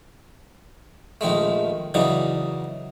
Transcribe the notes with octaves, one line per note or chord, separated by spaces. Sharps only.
A#1 D#3 G#3 A3
C#3 E3 F#3 D4 D#4